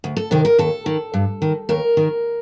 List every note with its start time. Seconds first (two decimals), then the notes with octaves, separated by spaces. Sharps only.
0.04 D2
0.17 A4
0.31 C3 D#3 A#4
0.45 A#4
0.58 D#2 A4
0.86 D#3
1.14 G2
1.42 D#3
1.69 D#2 A#4
1.97 D#3